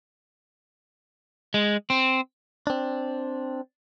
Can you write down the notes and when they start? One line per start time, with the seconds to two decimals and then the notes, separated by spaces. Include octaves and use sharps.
1.54 G#3
1.90 C4
2.67 C4 D4